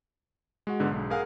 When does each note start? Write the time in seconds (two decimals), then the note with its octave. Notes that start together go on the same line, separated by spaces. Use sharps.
0.67 G#3 F#4 F#5
0.80 G#2 D3 B3
0.91 B1
1.10 G#4 A#4 F5 F#5 G#5